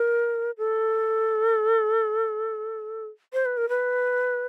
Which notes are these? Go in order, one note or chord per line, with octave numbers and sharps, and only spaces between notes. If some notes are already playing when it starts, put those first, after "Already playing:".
Already playing: A#4
A4
C5
B4
A#4
B4